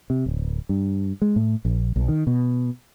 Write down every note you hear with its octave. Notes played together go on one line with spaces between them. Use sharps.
C3
D1
G2
G#3
A2
A#1
B1
D#3
B2